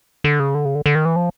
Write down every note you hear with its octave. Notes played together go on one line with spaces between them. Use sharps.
D3
C#3
D3
C#3
D3
D3
D#3
E3
F3